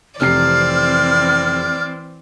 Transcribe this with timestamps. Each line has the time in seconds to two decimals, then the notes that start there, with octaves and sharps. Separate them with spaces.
0.20 F1 C3 E3 C4 D5 F6 C7